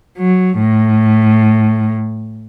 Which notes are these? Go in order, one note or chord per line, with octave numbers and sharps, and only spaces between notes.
F#3
A2